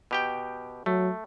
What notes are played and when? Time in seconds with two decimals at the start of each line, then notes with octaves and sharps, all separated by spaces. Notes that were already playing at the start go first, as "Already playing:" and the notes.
0.11 B2 G4 G5
0.86 F#3 A3